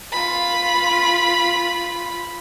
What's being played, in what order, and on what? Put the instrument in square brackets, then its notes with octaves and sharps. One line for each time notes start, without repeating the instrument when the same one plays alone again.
[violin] F4 B5